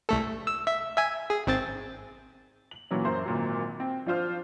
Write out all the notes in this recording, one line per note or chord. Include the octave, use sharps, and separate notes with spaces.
C2 A3 A4
E6
E5
E5 G#5
G#4
G#1 C4 A6
F#7
A#2 E3 F#3 C#4
F#2 A#4 C5 C6
G#1 A#2 F#3
C4
F3 D4 F4 C5 F6